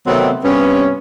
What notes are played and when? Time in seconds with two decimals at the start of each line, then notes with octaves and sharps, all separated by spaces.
0.06 C3 D#3 F#3 A3 B3 C4
0.44 G2 C3 B3 C#4